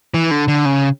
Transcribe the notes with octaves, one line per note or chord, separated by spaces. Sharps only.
E3
D3
D3
C#3